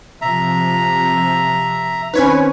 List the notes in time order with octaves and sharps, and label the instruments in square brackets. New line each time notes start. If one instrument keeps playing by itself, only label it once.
[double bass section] C3 F3 [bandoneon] E5 A#5
[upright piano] D#3 C4 C#4 [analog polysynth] B4 C#5 G#5